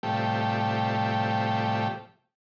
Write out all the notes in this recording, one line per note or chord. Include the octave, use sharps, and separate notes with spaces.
A2 C3 F3 G3 A3 G4